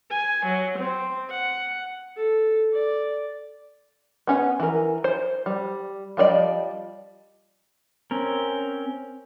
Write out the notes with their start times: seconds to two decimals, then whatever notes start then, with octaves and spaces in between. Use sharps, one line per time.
0.11 G#5
0.46 F#3
0.78 C4
1.30 F#5
2.17 A4
2.72 D5
4.27 B3 C#4 F#5
4.60 E3 A#4
5.04 C5
5.46 G3
6.17 F3 G3 D#4 D5 D#5
8.11 C4 C#4 A#4